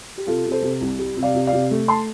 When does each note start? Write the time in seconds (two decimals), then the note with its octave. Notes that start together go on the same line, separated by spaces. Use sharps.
0.17 G4
0.27 C3 F4 A4
0.46 C3
0.51 A4 C5
0.62 C3
0.81 C2
0.99 G3
1.17 C3
1.23 D5 F5
1.35 C3
1.47 D5 F5
1.53 C3
1.71 A3
1.88 A5 C6